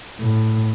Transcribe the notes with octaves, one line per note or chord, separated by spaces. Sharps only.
A2